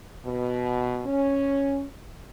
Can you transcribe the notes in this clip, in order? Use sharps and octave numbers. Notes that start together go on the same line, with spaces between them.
B2
C#4